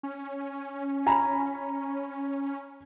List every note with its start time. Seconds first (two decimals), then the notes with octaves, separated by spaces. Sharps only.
0.03 C#4
1.07 G#5 A#5 B5